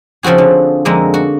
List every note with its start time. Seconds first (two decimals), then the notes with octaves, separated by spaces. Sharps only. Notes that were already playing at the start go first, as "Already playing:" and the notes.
0.23 C#3 F3 C4 F#4 G#4
0.38 D3
0.85 F2 D3 G#3 A#3 D#5
1.14 F#4